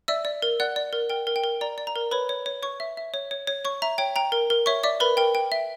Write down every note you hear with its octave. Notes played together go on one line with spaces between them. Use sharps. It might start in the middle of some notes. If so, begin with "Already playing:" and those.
D5 E5 E6
D5
A#4
D5 F#5 F#6
D5
A#4
A#4 G5
A#4
G5
A#4
D5 A#5
D5
A#5
A#4
B4 C#5 B5
C#5
C#5
C#5 C#6
E5
E5
C#5
C#5
C#5
C#5 C#6
E5 A#5
C#5 G5
G5 A#5
A#4
A#4
C#5 E5 C#6
D5 E5 D6
A#4 B4 B5
A#4 G5
G5
E5